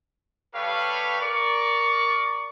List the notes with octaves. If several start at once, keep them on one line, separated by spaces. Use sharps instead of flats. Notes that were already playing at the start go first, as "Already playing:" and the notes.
G3 G4 A4 B4 C#5 F5
A#4 D5 C#6